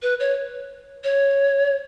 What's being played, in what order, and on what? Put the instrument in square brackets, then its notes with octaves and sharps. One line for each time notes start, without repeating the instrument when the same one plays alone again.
[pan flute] B4
C#5
C#5